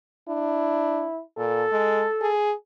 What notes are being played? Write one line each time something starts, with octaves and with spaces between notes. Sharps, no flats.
D4 E4
A#2 A4
G#3
G#4